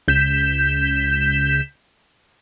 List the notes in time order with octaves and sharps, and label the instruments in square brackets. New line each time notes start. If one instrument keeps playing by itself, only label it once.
[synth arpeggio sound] C#2 G6 B6 E7